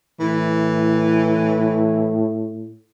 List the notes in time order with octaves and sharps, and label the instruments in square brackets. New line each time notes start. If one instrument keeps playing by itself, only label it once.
[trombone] A2 [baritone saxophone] E3